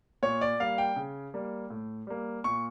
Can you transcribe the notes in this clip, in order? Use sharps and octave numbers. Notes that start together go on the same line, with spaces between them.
A#2 C#5
D5
G3 A#3 F5
G5
C#3
G3 A#3
A2
G3 A#3
A#2 C#6